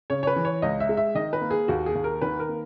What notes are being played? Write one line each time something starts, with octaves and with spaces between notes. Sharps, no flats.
C#3 C#5
C#5
B4
E3
C#5
C#2 D#5
E5
G#3
E5
D#3 D#5
B4
A#3
G#4
D#2 F#4
G#4
D#2
A#4
D#3 B4
A#4
A#3